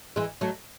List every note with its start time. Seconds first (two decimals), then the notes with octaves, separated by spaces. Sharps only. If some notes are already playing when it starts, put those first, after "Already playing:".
0.16 E3 G#3
0.41 F#3 A3